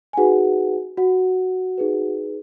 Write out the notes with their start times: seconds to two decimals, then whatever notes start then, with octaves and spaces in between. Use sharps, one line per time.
0.13 G#5
0.17 D#4 F#4 G#4 B4 F#5
0.97 F#4 F#5
1.78 D#4 G#4 B4